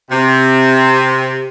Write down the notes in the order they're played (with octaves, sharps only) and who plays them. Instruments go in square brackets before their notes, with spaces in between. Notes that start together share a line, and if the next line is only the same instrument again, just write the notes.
[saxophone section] C3